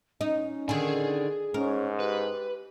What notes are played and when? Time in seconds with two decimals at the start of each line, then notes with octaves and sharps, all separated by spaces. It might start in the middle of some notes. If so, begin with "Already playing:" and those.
0.21 C#4 D#4
0.69 D3 D#3 G#4 G#5
1.54 G#2 C#4 A#4
2.00 G4 B4